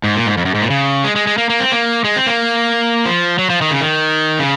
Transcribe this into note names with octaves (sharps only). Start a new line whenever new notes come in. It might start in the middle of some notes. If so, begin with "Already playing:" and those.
G#2
A#2
G#2
F2
F#2
G#2
A#2
C#3
G#3
G#3
G#3
A#3
A#3
C4
A#3
G#3
C4
A#3
F3
F#3
F3
D#3
C#3
D#3
C#3